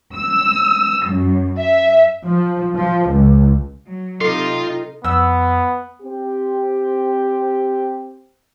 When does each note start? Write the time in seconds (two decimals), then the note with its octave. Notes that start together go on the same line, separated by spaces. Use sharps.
0.14 E6
1.07 F#2
1.58 E5
2.24 F3
2.75 F3
3.09 C#2
3.87 F#3
4.21 C3 D#4 F4 A4 C6
5.04 F2 B3 E6
6.02 C4 G4